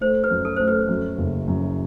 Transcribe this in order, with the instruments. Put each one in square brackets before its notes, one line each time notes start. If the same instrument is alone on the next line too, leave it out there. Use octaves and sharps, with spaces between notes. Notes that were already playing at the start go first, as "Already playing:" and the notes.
[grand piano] A3 [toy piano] C5
[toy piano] B4
[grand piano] F#2
[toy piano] A4
[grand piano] A3 [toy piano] C5
[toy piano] B4
[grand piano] F#2
F#1
F#2